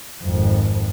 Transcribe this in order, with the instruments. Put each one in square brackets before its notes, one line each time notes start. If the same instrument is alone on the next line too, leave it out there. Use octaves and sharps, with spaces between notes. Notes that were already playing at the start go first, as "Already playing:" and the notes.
[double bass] G#1 F2